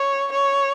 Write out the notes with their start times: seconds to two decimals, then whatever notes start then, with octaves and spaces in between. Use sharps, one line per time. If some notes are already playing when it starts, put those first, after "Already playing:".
Already playing: C#5
0.32 C#5